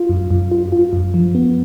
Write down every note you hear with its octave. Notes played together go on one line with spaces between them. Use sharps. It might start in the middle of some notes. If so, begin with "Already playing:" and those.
Already playing: F4
F#2
F#2
F4
F4
F#2
F3
B3